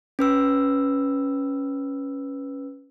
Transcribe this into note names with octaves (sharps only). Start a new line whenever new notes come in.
C#4 B4 E6